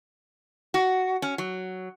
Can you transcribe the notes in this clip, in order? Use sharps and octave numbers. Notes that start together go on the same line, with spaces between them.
F#4
C#4
F#3